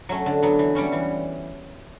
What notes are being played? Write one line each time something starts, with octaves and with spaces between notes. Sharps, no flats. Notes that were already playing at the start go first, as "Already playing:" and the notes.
F#3 A3 C#4
D3
F#3 B3
E3
G3 C#4 F#4
E3